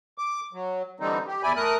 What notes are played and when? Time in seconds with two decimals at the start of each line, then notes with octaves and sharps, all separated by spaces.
0.18 D6
0.53 F#3
1.00 D3 E3 G3 C4 D#4
1.27 G4
1.43 E2 E4 D5 G#5 B5
1.56 A3 A#4 D#6 F#6